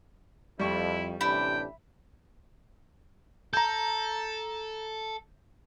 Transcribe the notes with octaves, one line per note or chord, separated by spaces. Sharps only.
F2 G3 E4 C#6
A1 C3 D4 E4 G5
A4 A#5 G6